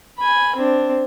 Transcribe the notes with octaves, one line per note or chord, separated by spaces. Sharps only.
G#5 B5
C4 D4